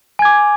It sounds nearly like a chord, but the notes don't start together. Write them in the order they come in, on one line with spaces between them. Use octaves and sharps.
G#5 G#6 D6